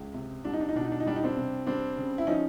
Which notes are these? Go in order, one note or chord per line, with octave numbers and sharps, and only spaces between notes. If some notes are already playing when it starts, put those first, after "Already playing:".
Already playing: C#2
C3
C2 D4
D#4
D4
D#4
B2 D4
D#4
D4
D#4
G3 D4
D#4
C4 D4
C3
G3 C4 D4
C#3
E4
F3 C#4 D#4